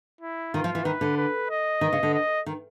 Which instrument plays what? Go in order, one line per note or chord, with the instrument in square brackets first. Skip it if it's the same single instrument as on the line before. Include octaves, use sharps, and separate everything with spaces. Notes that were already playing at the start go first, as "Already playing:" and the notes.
[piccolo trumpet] E4
[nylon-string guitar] D#3 [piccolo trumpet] F4
[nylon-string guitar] F3
E3
[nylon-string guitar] D#3 [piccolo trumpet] B4
[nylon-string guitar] D3
[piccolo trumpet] B4
D#5
[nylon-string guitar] D#3
C#3
D3
[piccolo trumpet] D#5
[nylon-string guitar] D#3